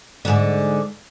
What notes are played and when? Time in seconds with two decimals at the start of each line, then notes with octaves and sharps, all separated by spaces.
0.25 G#2 D3